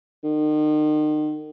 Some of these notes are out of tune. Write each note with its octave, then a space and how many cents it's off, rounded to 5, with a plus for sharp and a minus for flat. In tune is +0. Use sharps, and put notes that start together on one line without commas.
D#3 -35